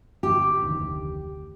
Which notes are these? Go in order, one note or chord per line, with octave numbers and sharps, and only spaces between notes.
G1 G4
F1 D2 D#3